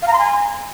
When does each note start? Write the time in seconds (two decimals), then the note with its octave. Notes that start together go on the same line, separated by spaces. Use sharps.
0.02 F5
0.08 A#5
0.13 C6
0.19 G#5